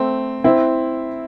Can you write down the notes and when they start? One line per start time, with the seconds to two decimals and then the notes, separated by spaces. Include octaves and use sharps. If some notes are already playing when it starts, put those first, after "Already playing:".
Already playing: A3 C4
0.44 C4 E4